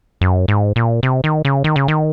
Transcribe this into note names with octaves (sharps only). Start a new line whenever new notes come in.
F#2
G#2
A#2
C3
D#3
C#3
D#3
C#3
D#3